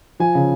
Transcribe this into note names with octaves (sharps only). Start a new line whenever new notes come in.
F3 G#5
C#3